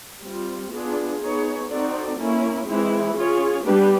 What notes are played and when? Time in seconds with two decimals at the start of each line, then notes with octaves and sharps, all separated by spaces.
0.23 G3 C4 F4
0.73 B3 D4 F4 G#4
1.22 B3 D#4 G#4 C#5
1.70 C4 D#4 F#4 A4 D5
2.18 A#3 C#4 E4
2.67 E3 G#3 C4 E4
3.16 C#4 F4 G#4 C#5
3.65 G3 B3 D4 G4 B4